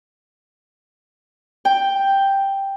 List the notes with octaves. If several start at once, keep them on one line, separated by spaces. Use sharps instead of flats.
G5